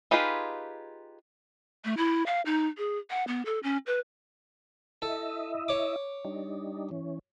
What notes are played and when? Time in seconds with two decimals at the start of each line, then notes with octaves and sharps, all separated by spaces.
0.11 D#4 F4 G4 G#4 B4
1.85 A3
1.97 E4
2.26 F5
2.46 D#4
2.78 G#4
3.10 F#5
3.28 B3
3.46 A4
3.63 C#4
3.87 B4
5.02 E4 A4 D#5 E5
5.68 C#5 D6
6.25 G3 D4 D#4
6.91 E3 C#4